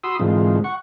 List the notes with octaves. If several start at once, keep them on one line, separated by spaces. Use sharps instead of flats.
F#4 B5 C6 D#6 E6
G#2 D3 E3 G#3 C4 F4
F#5 C#6